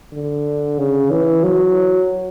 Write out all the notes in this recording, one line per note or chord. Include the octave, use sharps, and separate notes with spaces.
D3
C#3
E3
F#3